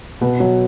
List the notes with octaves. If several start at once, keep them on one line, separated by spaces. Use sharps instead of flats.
B2 B4
F#3